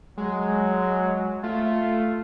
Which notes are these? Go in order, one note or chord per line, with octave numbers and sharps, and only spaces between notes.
F#3 G#3
A3 F4